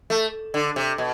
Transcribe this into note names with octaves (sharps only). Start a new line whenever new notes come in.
A3
D3
C3
B2